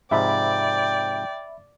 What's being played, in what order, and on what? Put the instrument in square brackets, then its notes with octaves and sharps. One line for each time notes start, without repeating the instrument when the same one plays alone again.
[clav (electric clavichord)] G#2 C3 F3 [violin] D5 [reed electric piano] E5 B5 [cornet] G5